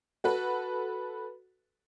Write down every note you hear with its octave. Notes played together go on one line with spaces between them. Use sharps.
F#4 A4 B4